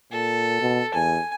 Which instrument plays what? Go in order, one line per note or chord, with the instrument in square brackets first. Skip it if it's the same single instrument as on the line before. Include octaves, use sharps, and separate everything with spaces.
[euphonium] A#2 [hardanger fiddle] A4
[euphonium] B2
[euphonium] E2 [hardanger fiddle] G#5